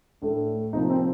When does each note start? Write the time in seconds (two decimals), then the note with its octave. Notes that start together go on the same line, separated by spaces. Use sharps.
0.22 A2 A3 D4
0.73 C3 F3 A#3 D#4
0.90 C4